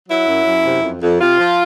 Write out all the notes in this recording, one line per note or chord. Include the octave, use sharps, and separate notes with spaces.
F#3 E4
F#2
F#2
C3
F2
F2
C3 F4
F3